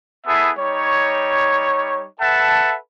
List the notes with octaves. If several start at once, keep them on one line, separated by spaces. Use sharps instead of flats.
B3 E4 G#4 A4 E5
G3 D#4 C#5
A4 B4 E5 F#5 A5